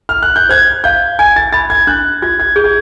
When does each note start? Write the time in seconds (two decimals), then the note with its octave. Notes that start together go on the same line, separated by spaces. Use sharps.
0.09 F6
0.23 F#6
0.36 G6
0.49 C5 G#6
0.84 F5 G6
1.19 G#5 G#6
1.36 A6
1.53 B5 A6
1.70 G#6
1.87 D4 F#6
2.22 F4 G#6
2.40 G#6
2.56 G#4 G6
2.64 G#6